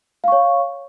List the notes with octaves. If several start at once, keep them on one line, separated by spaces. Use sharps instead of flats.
C#5 F5 C#6